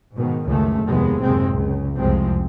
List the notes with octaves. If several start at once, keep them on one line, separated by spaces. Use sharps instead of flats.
G#2 B2 D#3
C#2 F#2 D#3 G#3 A3
F1 D#2 A2 C3 G#3 B3
F#1 D#2 C3 G#3 C4
C#2
C2 F2 C3 F3 G#3 C4